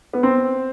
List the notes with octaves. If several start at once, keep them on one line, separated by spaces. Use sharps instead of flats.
B3
C4